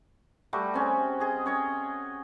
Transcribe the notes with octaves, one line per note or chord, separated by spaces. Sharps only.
G3 A3 F#4
C4 C#4 G#4
G#4 D#5
C#4 C#5 D#5